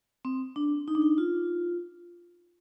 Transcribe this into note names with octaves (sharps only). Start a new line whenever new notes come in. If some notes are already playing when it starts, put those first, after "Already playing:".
C4
D4
D#4
D4
D#4
F4